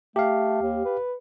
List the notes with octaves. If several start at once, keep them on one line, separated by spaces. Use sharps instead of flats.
A3 G4 F5
D#2
B4